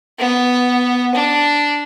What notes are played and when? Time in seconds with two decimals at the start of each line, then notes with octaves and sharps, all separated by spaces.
0.19 B3
1.15 D4